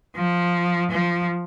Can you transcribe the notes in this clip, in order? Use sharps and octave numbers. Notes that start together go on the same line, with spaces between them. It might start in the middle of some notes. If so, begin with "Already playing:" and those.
F3
F3